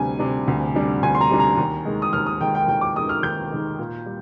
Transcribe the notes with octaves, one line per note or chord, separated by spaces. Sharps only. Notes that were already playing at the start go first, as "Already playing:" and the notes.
Already playing: D2 C3 G3 D4 G#5
C3 G3 D4
D2
C3 G3 D4
D2 G#5
C6
A#5
C3 G3 D4
A#5
D#2
D#3 G#3
D#6
D#2 F6
D#6
D#3 G#3 G5
G5
D#2 G5
D6
D#3 G#3 D#6
F6
D#2 G6
D#3 G#3
A#2
G3